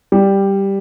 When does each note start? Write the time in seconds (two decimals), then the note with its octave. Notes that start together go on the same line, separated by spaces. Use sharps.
0.12 G3